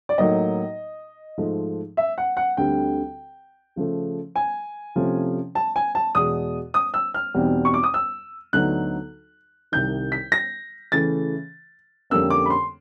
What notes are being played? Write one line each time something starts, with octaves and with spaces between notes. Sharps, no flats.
D5
A2 F#3 A#3 D#4 D#5
G#2 F3 A3
E5
F#5
F#5
D2 D3 G3 C4 G5
C#3 F3 A3
G#5
C3 F3 A3 C#4
A5
G#5
A5
E2 B2 G#3 D#6
D#6
E6
F6
E2 B2 G3 C4 D#4
C#6
D6
D#6
E6
D2 D3 F#3 B3 D#4 F#6
C2 C3 D#3 G6
B6
A#6
C#3 E3 A3 A6
F2 D3 G3 A#3 C#4 E6
D6
B5
C6